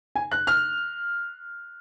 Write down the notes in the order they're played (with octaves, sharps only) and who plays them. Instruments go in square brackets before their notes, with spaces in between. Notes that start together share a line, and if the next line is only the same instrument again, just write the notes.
[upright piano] G#5
F#6
F6